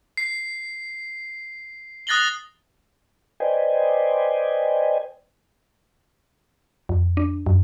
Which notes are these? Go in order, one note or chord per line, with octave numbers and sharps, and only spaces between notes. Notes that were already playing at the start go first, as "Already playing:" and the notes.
C7
D#6 F#6 A6 A#6 F#7 G7
B4 C5 D5 D#5 G5 G#5
F2
D4
F#2